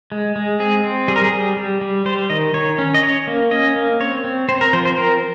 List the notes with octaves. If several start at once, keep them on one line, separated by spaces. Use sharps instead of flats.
G#3
G#3
C4 G#4
C4
G3 G#4
A#4
G#4
G3
G3
G3
G3 C5
D#3 D#5
D#3 C#5
C#4
D#5
C#4 C#5
A#3
C#4 D#5
A#3
C4 C#5
C4
C4 C5
A#4
F3 C5
C5
C4 A#4